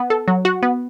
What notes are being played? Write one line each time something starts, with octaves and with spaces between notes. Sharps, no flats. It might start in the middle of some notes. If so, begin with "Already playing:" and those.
Already playing: B3
A4
F#3
F#4
B3